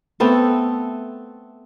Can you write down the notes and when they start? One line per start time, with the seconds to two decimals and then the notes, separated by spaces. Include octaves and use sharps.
0.20 A3 B3 C4 A4